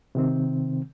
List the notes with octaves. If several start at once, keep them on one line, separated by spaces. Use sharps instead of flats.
C3 D#3 C4